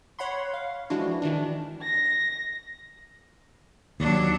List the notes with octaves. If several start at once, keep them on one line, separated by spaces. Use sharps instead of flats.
C#5 F#5 B5 C6
F5
E3 F3 G#3 D4 E4 F#4
D#3 E3 D4
A#6
D#2 F#3 D4